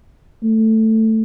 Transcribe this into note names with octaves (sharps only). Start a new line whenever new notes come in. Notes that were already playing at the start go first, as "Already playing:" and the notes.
A3